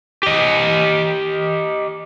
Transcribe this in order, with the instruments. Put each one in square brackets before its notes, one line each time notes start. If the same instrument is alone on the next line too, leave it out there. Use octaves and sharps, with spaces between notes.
[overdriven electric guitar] G4 D#5